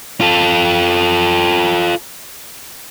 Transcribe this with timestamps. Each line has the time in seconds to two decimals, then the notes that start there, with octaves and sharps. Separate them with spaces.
0.21 F4 A4